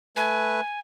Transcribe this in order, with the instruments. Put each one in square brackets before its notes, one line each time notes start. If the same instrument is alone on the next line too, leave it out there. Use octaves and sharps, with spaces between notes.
[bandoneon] A3 B4 [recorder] G#5